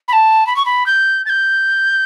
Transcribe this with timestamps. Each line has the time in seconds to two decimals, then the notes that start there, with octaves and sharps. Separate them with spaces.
0.08 B5
0.13 A5
0.47 B5
0.56 C#6
0.66 B5
0.86 G6
1.26 A6
1.29 G6